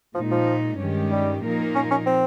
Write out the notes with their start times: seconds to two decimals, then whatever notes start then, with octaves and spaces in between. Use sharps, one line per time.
0.15 A#2 F3 G#3 D#4
0.32 F3
0.79 G2 D#3 G#3 C#4 G4
1.11 G3
1.43 A#2 F3 A#3 D#4 A#4
1.75 C#4
1.91 C#4
2.07 C4